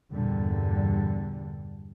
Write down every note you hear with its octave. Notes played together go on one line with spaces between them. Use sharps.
E2 G2 A#2 D3 G3